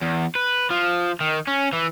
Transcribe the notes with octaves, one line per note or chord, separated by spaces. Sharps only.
E2
B4
F3
D#3
C#4
E3